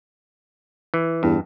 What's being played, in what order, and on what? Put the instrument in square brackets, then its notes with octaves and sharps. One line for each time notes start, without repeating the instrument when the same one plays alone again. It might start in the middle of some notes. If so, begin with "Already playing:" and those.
[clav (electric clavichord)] E3
[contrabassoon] E2 [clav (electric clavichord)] G2